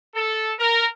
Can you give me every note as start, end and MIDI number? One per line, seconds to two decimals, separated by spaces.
0.14 0.52 69
0.59 0.88 70